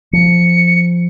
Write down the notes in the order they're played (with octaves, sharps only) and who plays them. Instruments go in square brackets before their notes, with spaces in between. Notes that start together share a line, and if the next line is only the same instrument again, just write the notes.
[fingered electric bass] F3 [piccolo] C#7